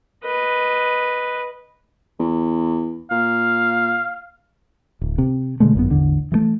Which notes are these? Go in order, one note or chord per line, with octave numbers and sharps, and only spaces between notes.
B4 D#5
E2
A#2 F5
D1
C3
B2 D3 G#3 A3
G#1 F#2 B3
A1 E2 G#2 D3
E3 F#3 A3